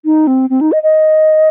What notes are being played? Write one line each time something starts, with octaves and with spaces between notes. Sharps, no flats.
D#4
C4
C4
D#4
D#5
D#5